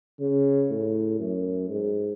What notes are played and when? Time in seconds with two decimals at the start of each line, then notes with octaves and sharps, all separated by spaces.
0.20 C#3
0.70 A2
1.19 F#2
1.69 G#2